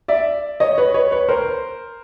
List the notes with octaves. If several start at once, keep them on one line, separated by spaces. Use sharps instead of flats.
D5 E5
C#5 D#5
B4 C#5
B4 C#5
B4 C#5
A#4 C5